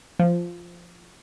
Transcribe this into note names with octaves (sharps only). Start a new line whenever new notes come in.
F3